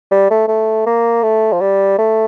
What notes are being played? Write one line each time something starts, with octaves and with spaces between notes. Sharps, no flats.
G3
A3
A3
A#3
A3
F3
G3
A3